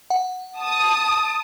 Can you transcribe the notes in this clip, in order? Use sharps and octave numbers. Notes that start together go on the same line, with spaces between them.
F#5
A5 D#6